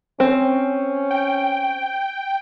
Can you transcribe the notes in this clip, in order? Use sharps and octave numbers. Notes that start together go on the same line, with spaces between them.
C4 C#4
G5